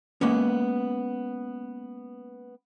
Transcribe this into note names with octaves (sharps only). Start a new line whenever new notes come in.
G#3 A#3 B3 C#4